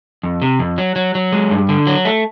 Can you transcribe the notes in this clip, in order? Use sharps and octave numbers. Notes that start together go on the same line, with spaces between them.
F2
C3
F2
F#3
F#3
F#3
G#3
G2
D3
F#3
A3